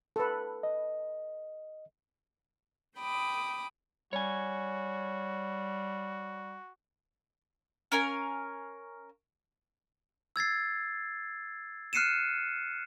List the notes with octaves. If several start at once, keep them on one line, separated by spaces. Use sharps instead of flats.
A4 B4
D#5
G5 B5 D6 D#6
G3 F#4 C#5 G#5
C#4 A#4 F5 G#5
E6 G#6 A6 C7
F6 F#6 C7 C#7 D#7 E7